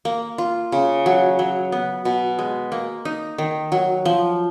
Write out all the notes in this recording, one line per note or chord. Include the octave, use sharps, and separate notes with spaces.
A#3
F4
C#3
F#3
F#3
B3
B2
G#3
A#3
D#4
D#3
F#3
F3